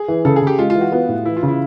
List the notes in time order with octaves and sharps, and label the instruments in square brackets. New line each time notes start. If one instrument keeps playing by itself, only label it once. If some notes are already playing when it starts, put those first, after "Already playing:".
Already playing: [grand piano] G#4
[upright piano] E3
[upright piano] C#3 [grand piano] A4
[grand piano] G#4
[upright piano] C#3
[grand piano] G4
[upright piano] G#3 [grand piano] F4
[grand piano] F4
[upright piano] E3
[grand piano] F#4
[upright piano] B3 [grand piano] F4
[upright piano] A2
[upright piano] E3 [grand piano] E4
[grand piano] F4
[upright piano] C#3
[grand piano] E4